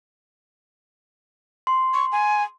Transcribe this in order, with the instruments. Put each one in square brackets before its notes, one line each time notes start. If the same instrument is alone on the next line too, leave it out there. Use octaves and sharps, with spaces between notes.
[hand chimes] C6
[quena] C#6
G#5